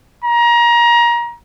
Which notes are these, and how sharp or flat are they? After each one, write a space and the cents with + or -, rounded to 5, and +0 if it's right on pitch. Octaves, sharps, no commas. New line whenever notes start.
A#5 +25